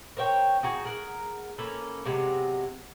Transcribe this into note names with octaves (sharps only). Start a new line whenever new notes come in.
A#4 C5 C#5 G5
D#4 F#4 G#4
G#4 A#4 F#5
A#3 C#4 A4 B4
C3 F#3 G#3 B3